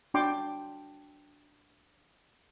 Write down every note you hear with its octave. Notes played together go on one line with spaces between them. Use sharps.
D4 F#4 D5 G5 C6 D6